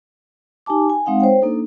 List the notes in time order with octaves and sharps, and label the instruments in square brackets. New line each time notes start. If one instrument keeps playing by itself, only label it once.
[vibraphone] D#4 G4 G#5 A5 D6
G5 G#5
G#3 C4 D#4 F5 F#5
C5 C#5 G5
A#3 D4 D#4 A4